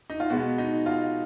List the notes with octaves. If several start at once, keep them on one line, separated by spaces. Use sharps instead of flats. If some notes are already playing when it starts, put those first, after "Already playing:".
D#4
F4
B2 G#3 B3 F#4
D#4
F4